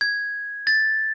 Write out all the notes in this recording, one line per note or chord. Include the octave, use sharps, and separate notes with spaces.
G#6
A6